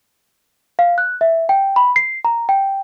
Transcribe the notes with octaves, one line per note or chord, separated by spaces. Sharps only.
F5
F#6
E5
G5
B5
C7
A#5
G5